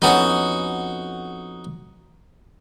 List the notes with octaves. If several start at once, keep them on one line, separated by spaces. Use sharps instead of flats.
F2 B3 C#4 D#4 F#4